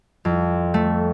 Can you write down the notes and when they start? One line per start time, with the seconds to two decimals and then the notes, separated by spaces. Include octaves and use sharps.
0.25 F2
0.74 A3